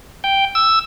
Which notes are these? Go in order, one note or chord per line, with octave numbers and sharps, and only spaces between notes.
G5
E6